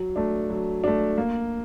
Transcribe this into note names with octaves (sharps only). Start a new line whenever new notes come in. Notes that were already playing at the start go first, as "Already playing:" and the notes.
Already playing: F#3
A3 D4
F#3
A3 D4
A#3